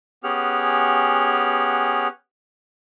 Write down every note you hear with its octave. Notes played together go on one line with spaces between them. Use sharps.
B3 C#4 G4 G#4 F#5 F6